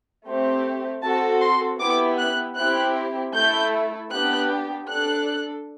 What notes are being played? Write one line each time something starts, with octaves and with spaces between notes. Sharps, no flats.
A3 C4 G4
C4 F#4 A4 A5
C6
B3 E4 G4 D6
F#6
C4 E4 G4 F#6
A3 E4 A4 G6
B3 D4 G4 F#6
D4 A4 F#6